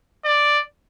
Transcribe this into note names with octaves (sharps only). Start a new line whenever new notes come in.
D5